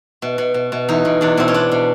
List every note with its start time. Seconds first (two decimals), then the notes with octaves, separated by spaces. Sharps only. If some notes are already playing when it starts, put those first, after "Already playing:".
0.22 B2
0.38 B2
0.54 B2
0.72 B2
0.89 E2 D#4
1.05 B2
1.21 E2 D4
1.37 B2 C4
1.48 C#4
1.54 B2 D4
1.71 B2